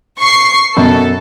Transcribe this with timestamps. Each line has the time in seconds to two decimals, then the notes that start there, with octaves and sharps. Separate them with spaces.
0.20 C#6 C7
0.77 F#2 B2 A4